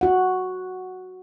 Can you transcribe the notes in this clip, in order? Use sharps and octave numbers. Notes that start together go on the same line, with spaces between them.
F#4 F#5